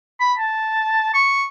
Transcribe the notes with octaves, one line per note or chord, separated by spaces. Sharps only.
B5
A5
C#6